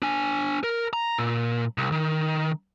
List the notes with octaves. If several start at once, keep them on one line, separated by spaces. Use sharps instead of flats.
D4 G#5
A#4
A#5
A#2
C2
D#3